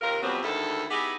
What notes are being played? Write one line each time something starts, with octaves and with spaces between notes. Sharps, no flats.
D#2 C3 F4 A#4
F2 B2 F#3 G3 B3 C4
D2 D#3 G#3 E4 A4
B3 D#4 E4 G4 G#4